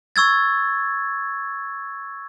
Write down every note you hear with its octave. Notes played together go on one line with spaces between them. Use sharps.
C#6 E6 G#6 A6